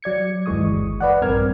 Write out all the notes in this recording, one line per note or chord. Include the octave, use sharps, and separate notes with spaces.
F#3 D5 G#6 C#7
G1 D#2 E3 G#3 C#6 D#6
B4 D5 F#5
A#1 G2 C4 A#4 F6 G#6